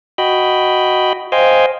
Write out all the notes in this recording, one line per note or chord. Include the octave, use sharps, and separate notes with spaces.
F#4 D#5 G5 B5
C5 D#5 F5 G5 G#5